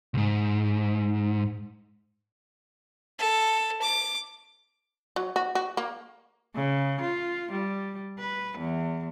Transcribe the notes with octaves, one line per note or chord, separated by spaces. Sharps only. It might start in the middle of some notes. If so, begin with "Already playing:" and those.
C2 G#2
A4
D6
F#3
F#4
F#4
A#3
C#3
F4
G3
B4
E2